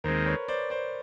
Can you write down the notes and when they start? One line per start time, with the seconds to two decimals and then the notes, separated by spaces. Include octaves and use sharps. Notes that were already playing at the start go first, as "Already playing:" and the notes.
0.04 D#2 D#3 G#3 C4 A#4 C5
0.26 B4 C#5
0.48 C5 D5
0.70 C5 D5